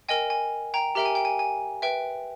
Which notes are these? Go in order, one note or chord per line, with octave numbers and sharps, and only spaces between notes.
A#4 D#5 G5 G#5
G#5
G5 A#5
G4 A#4 E5 G5 A#5
G#5
G5
G#5
G#5
B4 E5 G5